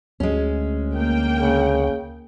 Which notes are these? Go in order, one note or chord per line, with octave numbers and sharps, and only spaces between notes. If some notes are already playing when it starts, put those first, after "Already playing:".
D2 G#3 C#4
A#3 G5
C#3